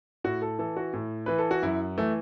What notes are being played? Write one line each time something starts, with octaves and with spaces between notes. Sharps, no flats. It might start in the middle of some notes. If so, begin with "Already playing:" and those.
A2 F#4
A4
E3 A4
F#4
A2
E3 B4
A4
F#4
F#2 E4
E3 A3